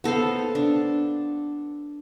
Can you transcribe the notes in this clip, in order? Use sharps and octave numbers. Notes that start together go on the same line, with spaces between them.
B3 A4 C5 F5
D4